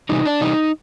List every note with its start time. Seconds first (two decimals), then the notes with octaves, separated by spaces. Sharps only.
0.09 C3 E3 G3 D#4
0.26 D4
0.41 C3 E3 G3 D#4